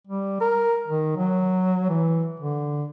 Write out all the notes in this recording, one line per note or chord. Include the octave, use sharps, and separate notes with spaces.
G3
A#4
D#3
F#3
E3
D3